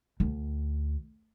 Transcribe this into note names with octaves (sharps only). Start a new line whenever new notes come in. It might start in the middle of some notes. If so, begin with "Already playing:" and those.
D2